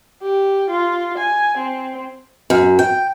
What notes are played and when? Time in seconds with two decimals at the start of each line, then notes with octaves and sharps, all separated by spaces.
0.22 G4
0.70 F4
1.18 G#5
1.58 C4
2.50 F#2
2.79 G5